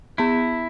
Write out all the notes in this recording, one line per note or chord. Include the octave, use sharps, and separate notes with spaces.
B3 E4